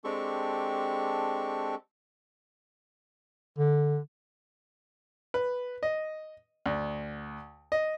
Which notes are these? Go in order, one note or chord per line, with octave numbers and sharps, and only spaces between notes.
G#3 C4 D4 G4 A4 C#6
D3
B4
D#5
D2
D#5